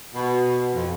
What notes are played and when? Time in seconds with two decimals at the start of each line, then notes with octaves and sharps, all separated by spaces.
0.14 B2
0.74 F2